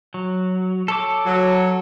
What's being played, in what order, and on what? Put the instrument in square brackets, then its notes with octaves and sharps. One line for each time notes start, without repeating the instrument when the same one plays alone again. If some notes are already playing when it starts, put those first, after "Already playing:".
[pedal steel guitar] F#3
A4 C#5 D6
[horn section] F#3